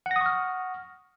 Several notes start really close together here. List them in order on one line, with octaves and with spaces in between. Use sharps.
F#5 A#6 D#6 C#6 F6